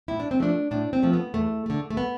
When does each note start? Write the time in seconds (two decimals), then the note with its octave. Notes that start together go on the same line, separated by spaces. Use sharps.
0.08 A2 E4
0.20 D4
0.31 C4
0.40 F3 A3 D4
0.71 A2 D4
0.93 C4
1.03 F3 A3
1.13 B3
1.34 E2 A3
1.66 D3 A3
1.90 A3
1.97 B3